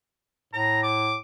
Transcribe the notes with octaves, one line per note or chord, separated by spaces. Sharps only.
A2 A#5
D6